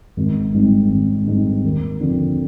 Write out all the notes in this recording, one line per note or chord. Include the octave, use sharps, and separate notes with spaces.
G#1
G#2 G3 C4 D#4
G#1
G#2 G3 C4 D#4
D#2
D3 F3 C4